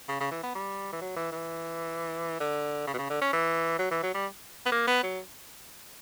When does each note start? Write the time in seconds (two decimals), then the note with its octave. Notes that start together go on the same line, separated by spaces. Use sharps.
0.09 C#3
0.20 C#3
0.31 E3
0.43 B3
0.55 G3
0.93 E3
1.01 F#3
1.17 E3
1.32 E3
2.40 D3
2.87 C#3
2.94 B2
2.98 C#3
3.10 D3
3.21 C#4
3.33 E3
3.79 F#3
3.91 E3
4.03 F#3
4.14 G3
4.66 B3
4.72 A#3
4.87 B3
5.03 F#3